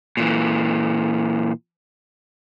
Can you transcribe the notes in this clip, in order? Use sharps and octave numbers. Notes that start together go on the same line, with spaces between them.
A#2 E3